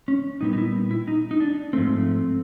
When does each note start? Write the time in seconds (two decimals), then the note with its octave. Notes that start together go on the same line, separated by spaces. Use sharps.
0.08 C#4
0.41 A#2 G3 B3 D#4
0.53 D#4
0.58 E4
0.91 E4
1.07 D#4
1.31 D#4
1.40 D4
1.73 G#2 F3 A3 C4